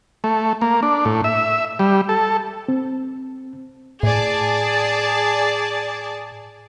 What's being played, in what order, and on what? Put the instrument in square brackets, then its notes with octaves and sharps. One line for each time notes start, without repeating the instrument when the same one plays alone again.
[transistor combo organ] A3
A#3
D4
A2
E5
G3
A4
[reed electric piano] C4
[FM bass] A2 [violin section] G#4 D5 A5